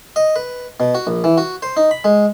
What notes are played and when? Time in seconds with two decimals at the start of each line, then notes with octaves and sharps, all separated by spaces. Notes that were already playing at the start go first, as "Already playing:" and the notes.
0.16 D#5
0.36 B4
0.80 B2
0.95 F#4
1.07 A#1
1.24 E3
1.38 F#4
1.62 C5
1.77 D#4
1.91 B5
2.04 G#3